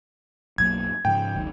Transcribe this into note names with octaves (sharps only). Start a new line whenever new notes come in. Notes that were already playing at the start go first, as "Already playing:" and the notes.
B1 F#2 A#3 G#6
G#2 C#3 F3 G5
F#1 C#2 D#3